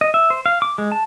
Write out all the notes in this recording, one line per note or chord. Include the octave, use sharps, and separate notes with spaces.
D#5
E5
C5
F5
D6
G#3
A5